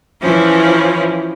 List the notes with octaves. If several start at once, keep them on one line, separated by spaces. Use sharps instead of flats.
E3 F3 C#4 E4